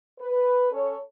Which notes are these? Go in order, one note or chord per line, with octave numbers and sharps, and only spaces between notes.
B4
C#4 A4 C#5